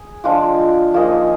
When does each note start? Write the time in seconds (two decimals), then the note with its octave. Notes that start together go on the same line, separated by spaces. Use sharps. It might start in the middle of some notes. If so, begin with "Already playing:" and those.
Already playing: G#4
0.24 F3 G#3 D4 F4
0.94 F3 A#3 D#4 G#4